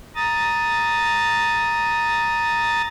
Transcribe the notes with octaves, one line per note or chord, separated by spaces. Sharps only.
A#5 D#6 A6